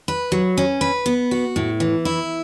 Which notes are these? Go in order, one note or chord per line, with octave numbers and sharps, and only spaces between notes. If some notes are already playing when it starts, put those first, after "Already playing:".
B4
F#3
C#4
B4
B3
F#4
A2
E3
E4